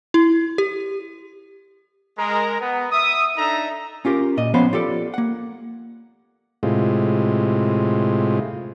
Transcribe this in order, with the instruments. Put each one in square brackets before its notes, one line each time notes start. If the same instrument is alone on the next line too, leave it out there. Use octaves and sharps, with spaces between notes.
[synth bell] E4
G4
[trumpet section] G#3 A#4 A#5
B3
E5 D#6
D4 D#4 A4 D#5 E5 A#5
[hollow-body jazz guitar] C#4 F4 G4 A#4
A#2 D#5
F3 B3 C#4 C5 F5 B5
F4 G4 A4 D5
A#3 F#5
[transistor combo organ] A2 C3 G#3 F4